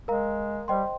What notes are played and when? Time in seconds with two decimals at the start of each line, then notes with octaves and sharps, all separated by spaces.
0.08 G#3 A#4 F5 A#5
0.68 G3 C5 D#5 G5 C6